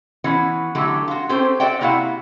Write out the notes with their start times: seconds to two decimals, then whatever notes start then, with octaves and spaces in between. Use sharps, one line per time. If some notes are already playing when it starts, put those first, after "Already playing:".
0.24 E3 B3 C#4 F#4
0.75 D3 F#3 A3 E4 G4
1.08 F4 F#4
1.29 C4 C#4 G4 A4 C5
1.60 F#4 D5 E5 G5
1.81 C3 A#3 E4 F#4 F5 F#5